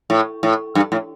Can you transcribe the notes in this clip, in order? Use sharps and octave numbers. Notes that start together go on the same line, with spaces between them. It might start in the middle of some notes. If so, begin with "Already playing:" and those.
A2
A2
G2
A2